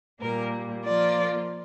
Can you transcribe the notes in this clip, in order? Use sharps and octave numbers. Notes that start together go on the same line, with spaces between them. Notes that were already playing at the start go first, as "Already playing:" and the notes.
A#2 G3 A#3 A#4
F3 A#3 F4 D5